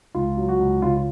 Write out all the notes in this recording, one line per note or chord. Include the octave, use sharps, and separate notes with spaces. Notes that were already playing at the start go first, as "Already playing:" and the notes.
C#2 F4
F#3
F#4
C#2
C#3 F4
F4